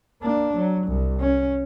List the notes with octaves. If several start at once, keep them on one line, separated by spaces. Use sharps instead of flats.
A#3 D4
F#3
C2
C#4